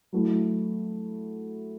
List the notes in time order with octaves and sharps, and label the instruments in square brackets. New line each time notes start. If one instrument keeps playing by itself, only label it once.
[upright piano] F#3 A3 E4